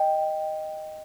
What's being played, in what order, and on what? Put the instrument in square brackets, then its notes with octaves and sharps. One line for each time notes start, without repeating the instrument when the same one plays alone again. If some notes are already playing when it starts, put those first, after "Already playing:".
Already playing: [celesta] D#5 G5